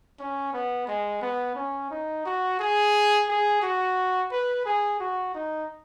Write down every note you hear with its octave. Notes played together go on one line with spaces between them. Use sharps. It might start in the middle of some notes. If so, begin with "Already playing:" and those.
C#4
B3
G#3
B3
C#4
D#4
F#4
G#4
G#4
F#4
B4
G#4
F#4
D#4